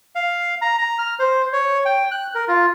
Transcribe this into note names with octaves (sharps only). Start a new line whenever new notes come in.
F5
A#5
A#5
F6
C5
C#5
G5
F#6
A#4
F4